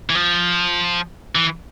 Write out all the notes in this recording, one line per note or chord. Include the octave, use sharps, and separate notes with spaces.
E3
F3
E3